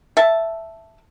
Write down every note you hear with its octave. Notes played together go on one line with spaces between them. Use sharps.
E5 A5